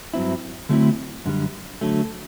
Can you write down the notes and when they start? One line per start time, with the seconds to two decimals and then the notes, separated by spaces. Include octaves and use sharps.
0.14 G2 F#3 C4 E4
0.69 D3 F#3 A3 C4 E4
1.26 F#2 D3 G3
1.81 D3 F#3 A3